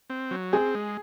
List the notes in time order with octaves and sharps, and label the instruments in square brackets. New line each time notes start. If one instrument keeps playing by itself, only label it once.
[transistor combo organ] C4
F#3
[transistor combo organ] C4 [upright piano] G#4
[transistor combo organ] G#3